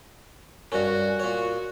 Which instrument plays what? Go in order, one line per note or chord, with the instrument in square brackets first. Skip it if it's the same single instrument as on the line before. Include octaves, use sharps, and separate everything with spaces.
[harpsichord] G2 C#4 [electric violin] F#4 [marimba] A#4 D5
[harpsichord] A#2 C#5